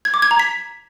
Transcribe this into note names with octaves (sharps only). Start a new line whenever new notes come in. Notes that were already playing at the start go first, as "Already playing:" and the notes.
G#6
D6
G#6
A#5
B6